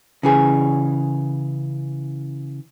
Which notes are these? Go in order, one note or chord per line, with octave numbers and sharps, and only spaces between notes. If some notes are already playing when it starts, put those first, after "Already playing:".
C#3 E3 G#4